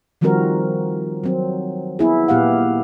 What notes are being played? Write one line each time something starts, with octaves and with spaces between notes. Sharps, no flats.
D#3 F3 G3 C4 F#4 A#4
F#3 C4
B3 E4 G#4
A#2 B3 G4 F5 F#5